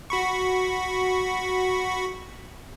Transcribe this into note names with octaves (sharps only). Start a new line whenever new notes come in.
F#4 B5 C#6